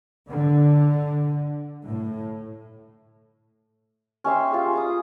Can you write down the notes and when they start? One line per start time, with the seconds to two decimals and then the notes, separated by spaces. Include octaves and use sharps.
0.28 D3
1.85 A2
4.24 C#4 G4 E5 C6
4.51 F4 G#4
4.73 B5 D6 D#6